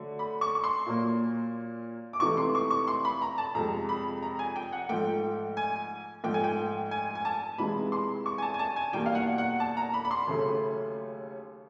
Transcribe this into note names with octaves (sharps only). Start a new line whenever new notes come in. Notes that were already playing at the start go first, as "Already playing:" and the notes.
Already playing: D3 F#3 A3
B5
C#6
C#6
C6
A#2 F#3 A#3
D6
C#2 C3 E3 A3 C#6
C6
C#6
C#6
C6
B5
A#5
A5
F2 C3 F3 G#3 A#5
B5
A#5
G#5
G5
F#5
G#2 F3 A3 G5
G#5
G#2 F3 A3 G5
G#5
G5
G#5
G#5
A5
C#2 C3 E3 G#3 B5
C6
C#6
G#5
A5
G#5
A5
G#5
E2 B2 G3 A#3 G5
F5
F#5
F#5
A5
A#5
B5
B5
C6
D#2 C#3 F#3 A3